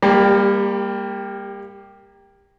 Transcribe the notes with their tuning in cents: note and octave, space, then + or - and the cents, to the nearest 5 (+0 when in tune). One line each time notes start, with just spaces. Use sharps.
G3 +30 A#3 +0 G4 +0